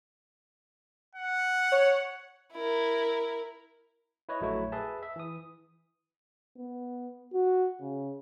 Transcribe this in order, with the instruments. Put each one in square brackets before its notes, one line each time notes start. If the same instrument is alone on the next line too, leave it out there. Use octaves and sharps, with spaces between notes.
[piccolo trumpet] F#5
[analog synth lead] C#5
[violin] E4 A#4
[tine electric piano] E4 B4 C#5 D#5
A#1 F#3 A3 E4 C#5
G#4 B4 E5 A5
E5
E3 D#6
[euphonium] B3
F#4
C#3